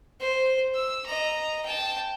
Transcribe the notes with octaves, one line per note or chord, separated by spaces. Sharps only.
C5
E6
D#5 A#5
G5 A5